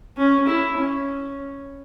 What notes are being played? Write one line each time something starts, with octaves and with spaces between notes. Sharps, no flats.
C#4
E4
C#4